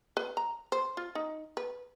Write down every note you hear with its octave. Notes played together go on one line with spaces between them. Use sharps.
B4
A#5
C5
F4
D#4
B4